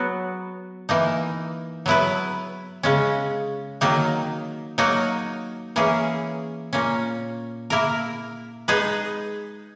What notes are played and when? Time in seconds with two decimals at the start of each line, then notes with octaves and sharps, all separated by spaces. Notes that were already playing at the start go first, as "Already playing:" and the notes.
Already playing: F#3 B3 F#4
0.89 E3 A#3 D#4
1.86 F#3 B3 E4 B4
2.83 C#3 G#3 C#4
3.81 D#3 F#3 A#3 D#4
4.78 F#3 A#3 D#4 F#4
5.76 E3 A#3 C#4 G#4
6.73 A#2 A#3 C#4
7.70 A#3 E4 A#4
8.68 G#3 D#4 G#4 B4